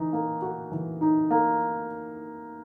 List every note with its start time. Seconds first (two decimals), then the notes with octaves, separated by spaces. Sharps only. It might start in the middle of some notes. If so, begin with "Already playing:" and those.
Already playing: E3 D#4
0.13 A#3
0.42 F#4
0.72 E3
1.01 D#4
1.31 A#3